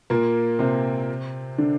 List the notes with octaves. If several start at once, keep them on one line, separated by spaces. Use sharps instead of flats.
A#2 A#3
C3 C4
D3 D4